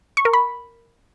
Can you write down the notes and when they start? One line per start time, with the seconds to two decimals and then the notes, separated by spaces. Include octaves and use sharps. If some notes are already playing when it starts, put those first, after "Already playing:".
0.17 C#6
0.25 A#4
0.33 B5